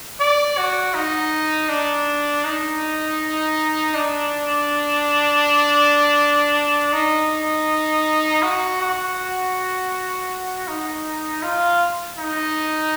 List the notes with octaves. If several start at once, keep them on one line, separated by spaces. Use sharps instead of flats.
D5
F#4
D#4
D4
D#4
D4
D#4
F#4
F#4
D#4
F4
D#4